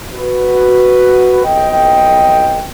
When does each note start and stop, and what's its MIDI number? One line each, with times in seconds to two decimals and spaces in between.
0.13 1.41 66
0.13 1.41 71
1.44 2.65 35
1.44 2.65 41
1.44 2.65 75
1.44 2.65 79